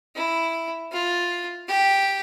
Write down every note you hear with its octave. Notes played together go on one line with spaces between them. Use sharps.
E4
F4
G4